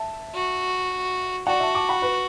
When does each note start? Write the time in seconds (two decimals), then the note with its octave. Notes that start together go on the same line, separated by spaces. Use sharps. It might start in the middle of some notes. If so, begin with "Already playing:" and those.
Already playing: E5 A5
0.34 F#4
1.47 F#4 D5 F#5
1.60 E5 A5
1.75 A5 D6
1.89 F#5 B5
2.02 B4